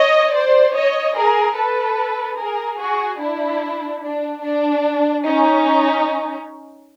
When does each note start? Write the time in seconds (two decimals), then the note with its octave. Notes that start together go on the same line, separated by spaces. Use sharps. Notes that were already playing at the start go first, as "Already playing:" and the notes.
Already playing: C#5 D#5
0.34 C5 D5
0.75 C#5 D#5
1.16 G#4 A#4
1.57 A4 B4
2.39 G#4 A#4
2.80 F#4 G#4
3.21 D4 E4
4.03 D4
4.44 D4
5.26 C#4 D#4